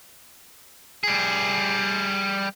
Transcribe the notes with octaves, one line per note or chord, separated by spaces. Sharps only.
G3 G#4